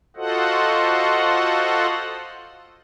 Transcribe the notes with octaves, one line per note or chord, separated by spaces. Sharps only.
F4 F#4 A4 C5 D#5 F#5